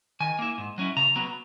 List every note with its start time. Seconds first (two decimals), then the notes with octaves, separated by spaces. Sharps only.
0.20 D#3 G#5
0.39 A#3 E4
0.58 G#2
0.78 F#3 C#4 E4
0.96 C#3 A#5
1.16 F#3 B3 A#5